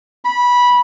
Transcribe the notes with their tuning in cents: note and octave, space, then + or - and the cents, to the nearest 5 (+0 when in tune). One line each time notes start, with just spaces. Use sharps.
B5 -15